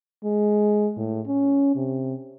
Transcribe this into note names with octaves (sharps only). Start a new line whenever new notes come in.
G#3
A2
C#4
C3